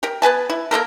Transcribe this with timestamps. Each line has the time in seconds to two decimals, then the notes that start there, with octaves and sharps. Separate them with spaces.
0.03 G4 A#4
0.22 B3 B4 G#5 A5
0.50 E4
0.71 A#3 B3 A4 A#4